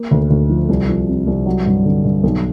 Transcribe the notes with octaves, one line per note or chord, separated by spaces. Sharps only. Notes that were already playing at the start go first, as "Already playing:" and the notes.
Already playing: A#3
D2
D2
F3
C2
F3
C3
C2
F#3
G2
D3
G2
B1